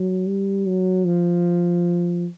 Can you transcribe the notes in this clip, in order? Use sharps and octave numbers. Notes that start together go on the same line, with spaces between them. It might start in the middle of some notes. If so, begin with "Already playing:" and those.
Already playing: F#3
G3
F#3
F3